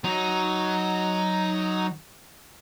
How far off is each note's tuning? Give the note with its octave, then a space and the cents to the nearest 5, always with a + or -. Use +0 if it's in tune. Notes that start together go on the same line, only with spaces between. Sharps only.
F#3 +0 D#4 +0